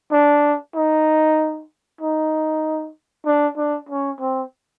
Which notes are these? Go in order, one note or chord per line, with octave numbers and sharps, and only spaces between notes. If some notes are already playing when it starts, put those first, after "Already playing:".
D4
D#4
D#4
D4
D4
C#4
C4